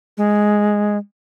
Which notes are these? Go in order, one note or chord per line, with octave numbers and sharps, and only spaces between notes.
G#3